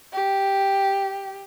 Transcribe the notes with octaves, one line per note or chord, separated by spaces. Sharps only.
G4